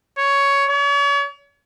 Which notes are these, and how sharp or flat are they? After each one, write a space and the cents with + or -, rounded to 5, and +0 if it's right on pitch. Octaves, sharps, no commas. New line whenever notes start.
C#5 +10
C#5 +40